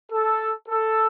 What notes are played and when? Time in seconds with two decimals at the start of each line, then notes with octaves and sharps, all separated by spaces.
0.11 A4
0.68 A4